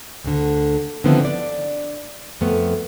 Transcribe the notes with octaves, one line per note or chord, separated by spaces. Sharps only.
D2 D3
D3 D#3 F3 B3 C4 E4
D4 D5
F2 A3 B3